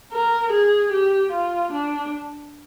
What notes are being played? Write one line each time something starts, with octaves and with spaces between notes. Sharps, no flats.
A#4
G#4
G4
F4
D4